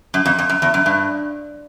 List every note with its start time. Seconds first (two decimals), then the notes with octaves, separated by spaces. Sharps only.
0.14 F#2
0.26 F2
0.39 F2
0.49 F#2
0.62 E2
0.74 F#2
0.86 G2